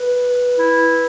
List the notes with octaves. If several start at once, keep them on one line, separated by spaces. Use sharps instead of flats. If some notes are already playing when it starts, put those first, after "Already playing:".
Already playing: B4
E4